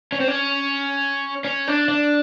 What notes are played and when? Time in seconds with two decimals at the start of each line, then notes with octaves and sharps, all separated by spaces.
0.12 C#4
0.20 C4
0.28 C#4
1.45 C#4
1.68 D4
1.89 D4